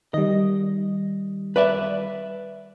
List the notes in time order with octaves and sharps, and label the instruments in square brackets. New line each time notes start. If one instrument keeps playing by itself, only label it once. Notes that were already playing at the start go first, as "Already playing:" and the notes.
[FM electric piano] D#3 G3 [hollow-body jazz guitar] D#5
[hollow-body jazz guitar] B4 D5 E5